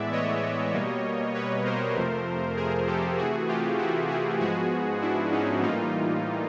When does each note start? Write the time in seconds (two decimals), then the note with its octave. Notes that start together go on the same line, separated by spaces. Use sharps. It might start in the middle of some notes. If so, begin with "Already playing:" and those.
Already playing: A2 E3 G#3 B3 D5 E5
0.12 C#5 D#5
0.74 B2 G3 A#3
1.34 B4 C#5
1.65 A#4 C5
1.96 F2 C3 F3 A3
2.57 G#4 A#4
2.87 G4 A4
3.18 C3 E3 A3 F#4 G#4
3.48 F4 G4
3.79 E4 F#4
4.09 F#4 G#4
4.40 G#2 F3 G#3 B3 F#4 G#4
5.01 D4 E4
5.32 C#4 D#4
5.62 A2 E3 G3 A#3 D#4 F4